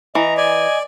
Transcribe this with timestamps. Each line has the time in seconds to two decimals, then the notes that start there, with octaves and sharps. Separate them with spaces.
0.15 E3 D#5 A#5
0.37 D5 G#5